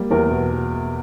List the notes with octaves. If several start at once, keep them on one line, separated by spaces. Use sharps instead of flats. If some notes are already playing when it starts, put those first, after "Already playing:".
Already playing: G3 A#3
E2 A#4
B2